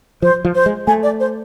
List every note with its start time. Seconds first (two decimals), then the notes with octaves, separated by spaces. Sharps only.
0.22 F3 C5
0.45 F3
0.55 C5
0.66 G#3
0.87 A3 G#5
1.03 D5
1.20 C5